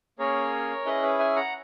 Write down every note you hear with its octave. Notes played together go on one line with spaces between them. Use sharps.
A#3 C#4 G#4 A#4 C#5
C#4 E4 G#4 B4 D#5
B4
E5 G#5
F#5 A#5